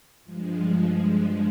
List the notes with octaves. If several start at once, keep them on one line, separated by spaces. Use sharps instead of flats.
G2 F3 G#3